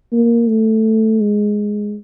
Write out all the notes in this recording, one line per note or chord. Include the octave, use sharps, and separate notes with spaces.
A#3
A3
G#3